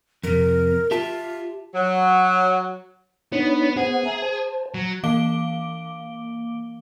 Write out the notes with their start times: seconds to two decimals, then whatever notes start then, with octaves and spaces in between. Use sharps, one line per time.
0.24 F2 C3 A#4
0.91 F4 G4 E5 A5
1.74 F#3
3.32 B3 D4 D#4 C#5
3.77 B3 G#4 C5 F#5
4.05 E5 G#5 A#5
4.22 C5 A5
4.74 F#3
5.03 E3 A#3 F5 D6 D7 G7